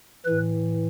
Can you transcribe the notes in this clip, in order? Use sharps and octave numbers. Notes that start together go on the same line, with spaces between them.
A2 E3 B4